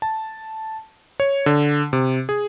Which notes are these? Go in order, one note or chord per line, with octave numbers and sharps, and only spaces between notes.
A5
C#5
D3
C3
G#4